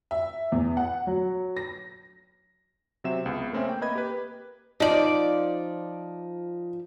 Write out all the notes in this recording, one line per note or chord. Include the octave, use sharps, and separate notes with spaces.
E5
E2
F#5
F#3
A#6
C3 F#3 C4 E5 E7
C#2 B3
A3 A#3 C4 C#4 E5
G5
A#3 B4 D#5 B5 G#6
G4 B4
F3 D#4 D5